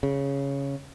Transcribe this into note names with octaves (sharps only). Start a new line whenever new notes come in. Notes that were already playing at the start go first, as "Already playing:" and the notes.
C#3